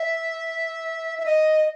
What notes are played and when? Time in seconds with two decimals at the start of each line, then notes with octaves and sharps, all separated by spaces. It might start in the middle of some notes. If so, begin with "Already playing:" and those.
Already playing: E5
1.19 E5
1.26 D#5